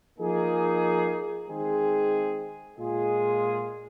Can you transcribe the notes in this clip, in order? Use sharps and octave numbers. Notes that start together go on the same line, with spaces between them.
F3 A#3 D#4 G#4
D#3 G#3 C4 G#4
A#2 G#3 F4 G#4